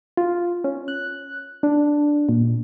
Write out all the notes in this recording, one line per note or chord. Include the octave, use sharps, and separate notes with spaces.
F4
C#4
F#6
D4
A#2